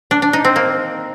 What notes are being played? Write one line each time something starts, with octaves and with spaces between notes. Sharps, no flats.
D4
D4
D#4
C4
A#3